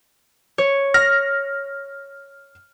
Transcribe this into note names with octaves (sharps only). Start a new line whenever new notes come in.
C#5
F6 A#6